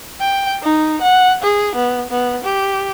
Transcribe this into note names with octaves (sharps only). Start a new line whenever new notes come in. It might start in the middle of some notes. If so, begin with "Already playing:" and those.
G5
D#4
F#5
G#4
B3
B3
G4